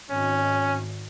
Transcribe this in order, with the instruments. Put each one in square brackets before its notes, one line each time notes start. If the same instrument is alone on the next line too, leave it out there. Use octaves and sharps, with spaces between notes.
[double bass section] G#1 [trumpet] C#4